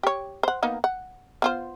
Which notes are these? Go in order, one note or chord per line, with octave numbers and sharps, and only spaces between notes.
G4 C#5
C5 F#5
A#3 B3 D#4
F#5
B3 F4 C5